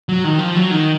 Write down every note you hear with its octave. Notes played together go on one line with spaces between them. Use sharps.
F#3
D#3
F3
F#3
D#3